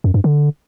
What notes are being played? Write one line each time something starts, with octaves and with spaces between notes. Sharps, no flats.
F#2
G2
D3